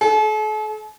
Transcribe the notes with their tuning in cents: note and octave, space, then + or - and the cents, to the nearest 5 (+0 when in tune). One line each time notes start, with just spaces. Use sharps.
A4 -45